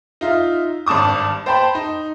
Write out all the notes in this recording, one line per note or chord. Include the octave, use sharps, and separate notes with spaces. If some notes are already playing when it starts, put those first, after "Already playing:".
D#4 F4 E5
G#1 G2 A5 D6 D#6
C5 G5 A5 B5 C6
D#4